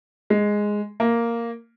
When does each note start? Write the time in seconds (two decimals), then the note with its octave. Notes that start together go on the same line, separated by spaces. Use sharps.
0.30 G#3
1.00 A#3